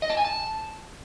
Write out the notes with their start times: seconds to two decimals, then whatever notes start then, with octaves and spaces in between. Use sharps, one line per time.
0.02 D#5
0.10 A5
0.17 G#5
0.25 A5